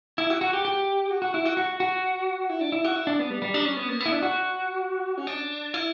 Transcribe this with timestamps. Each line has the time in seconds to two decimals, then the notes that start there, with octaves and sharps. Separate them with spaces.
0.18 E4
0.30 F#4
0.41 F#4
0.53 G4
0.65 G4
1.11 F#4
1.22 F#4
1.34 E4
1.45 F#4
1.57 F#4
1.80 F#4
2.49 E4
2.61 D4
2.72 E4
2.85 F#4
2.96 E4
3.07 D4
3.19 B3
3.30 G3
3.42 G3
3.54 D4
3.65 C#4
3.77 B3
3.88 A#3
4.00 B3
4.06 E4
4.12 D4
4.23 F#4
5.18 C#4
5.27 D4
5.74 E4